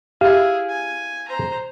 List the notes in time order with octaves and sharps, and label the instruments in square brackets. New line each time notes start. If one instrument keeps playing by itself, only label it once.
[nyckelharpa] E4 G#4 [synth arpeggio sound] G4 E5 [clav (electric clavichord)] F5
[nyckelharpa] G#5
C5 A#5